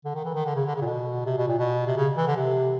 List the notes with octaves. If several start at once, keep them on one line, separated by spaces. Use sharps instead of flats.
D3
D#3
E3
D#3
D3
C#3
D3
C#3
A#2
B2
C3
B2
A#2
B2
C3
C#3
E3
D3
C3